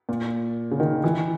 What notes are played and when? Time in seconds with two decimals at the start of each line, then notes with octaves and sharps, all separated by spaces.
0.09 A#2
0.71 C#3
0.80 D#3
1.04 E3